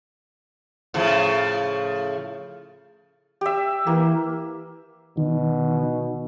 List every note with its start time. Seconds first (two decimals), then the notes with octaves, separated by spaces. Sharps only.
0.94 A2 C#3 F3
3.41 G4 E5
3.87 E3 A#3
5.17 B2 D#3